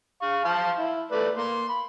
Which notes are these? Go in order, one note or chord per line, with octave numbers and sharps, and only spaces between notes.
F5 C#6
F5 A5 C6
E4
A3 B4 D5
A#3 C6
B5